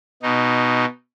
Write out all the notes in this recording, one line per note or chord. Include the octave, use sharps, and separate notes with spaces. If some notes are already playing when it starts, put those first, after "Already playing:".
B2 D#4